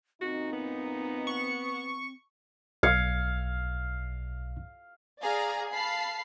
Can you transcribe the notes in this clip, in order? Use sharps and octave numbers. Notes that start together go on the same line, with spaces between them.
F#2 A#2 C4 D#4 F#4
B3
C#6
B1 F5 G#6 C#7
G#4 D5 F5 A#5
F5 A5 B5 C7